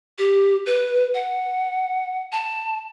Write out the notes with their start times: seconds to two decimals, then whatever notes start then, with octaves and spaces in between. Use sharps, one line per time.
0.18 G4
0.66 B4
1.14 F#5
2.32 A5